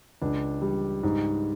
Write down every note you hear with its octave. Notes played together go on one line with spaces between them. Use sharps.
C#2 D4
G3
G#2